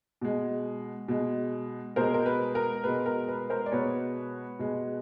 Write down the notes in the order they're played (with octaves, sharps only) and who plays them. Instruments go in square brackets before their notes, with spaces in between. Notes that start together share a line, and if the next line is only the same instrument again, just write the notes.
[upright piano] B2 G#3
B2 G#3
B2 G#3 A#4 C5
A#4
B4
A#4
B2 G#3 B4
A#4
B4
A#4 C5
D5
B2 G#3 B4 C#5
B2 G#3